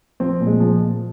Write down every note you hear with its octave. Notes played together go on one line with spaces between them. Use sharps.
F3 C4
A#2
G#3
F3